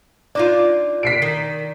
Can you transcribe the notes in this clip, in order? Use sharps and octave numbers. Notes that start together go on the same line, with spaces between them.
D4 D#4 F4 D5 D6
B6 C7 D7
D#3